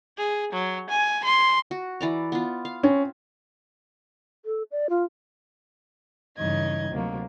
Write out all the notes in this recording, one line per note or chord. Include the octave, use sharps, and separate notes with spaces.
G#4
F#3
G#5
C6
F#4
E3 D5 A#5
B3 F4
F5
C4 C#4
A4
D5
F4
G2 C#3 E3 D#4 D#5 G#6
D2 C3 F#3 A#3